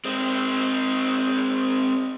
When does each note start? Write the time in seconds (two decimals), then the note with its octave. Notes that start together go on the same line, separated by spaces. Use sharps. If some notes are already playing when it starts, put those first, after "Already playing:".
0.05 G#3 C4